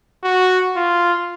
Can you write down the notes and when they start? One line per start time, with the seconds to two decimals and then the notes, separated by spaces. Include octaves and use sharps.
0.24 F#4
0.77 F4